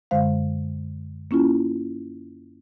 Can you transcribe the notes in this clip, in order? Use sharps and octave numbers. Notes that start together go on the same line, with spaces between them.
F#2 D3 G#3 C5 F5
A#3 C#4 E4 F4